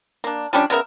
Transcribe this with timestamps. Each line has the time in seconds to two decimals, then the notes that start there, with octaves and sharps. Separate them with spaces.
0.24 A#3 D4
0.53 F3 G3 C#4 D4
0.70 C#3 B3 A#4 E5